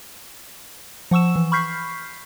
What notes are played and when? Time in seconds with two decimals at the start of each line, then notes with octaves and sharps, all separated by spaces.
1.11 F3 F#5 C#6 E6 E7
1.36 E3
1.52 B5 C#6 F6 G6 B6 C7